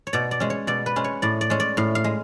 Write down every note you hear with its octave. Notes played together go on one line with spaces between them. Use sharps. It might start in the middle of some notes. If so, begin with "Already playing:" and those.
C#5
B2 D5
D5
G#3 C#4
C#5
B2 D5
B4
G#3 C#4
C#5
A2 D5
D5
G#3 C#4
D5
A2 F5
F5
G#3